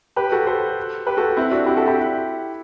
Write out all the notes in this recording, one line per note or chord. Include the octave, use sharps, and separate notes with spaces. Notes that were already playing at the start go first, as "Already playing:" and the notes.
G4 B4
F#4 A4
A4 C5
G4 B4
F#4 A4
C4 E4
D4 F#4
E4 G4
F#4 A4
E4 G4